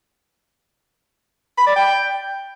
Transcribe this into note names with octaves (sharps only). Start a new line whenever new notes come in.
B5
D5
G5